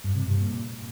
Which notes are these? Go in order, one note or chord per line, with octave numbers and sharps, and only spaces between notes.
G2
C3
G2
A#2